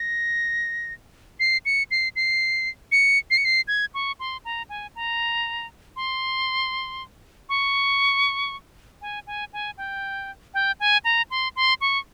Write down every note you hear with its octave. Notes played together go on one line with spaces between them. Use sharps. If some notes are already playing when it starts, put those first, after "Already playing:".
Already playing: A#6
C7
C#7
C7
C7
C#7
C7
C#7
C7
G#6
C#6
C6
A#5
G#5
A#5
C6
C#6
G#5
G#5
G#5
G5
G5
G#5
A#5
C6
C6
C#6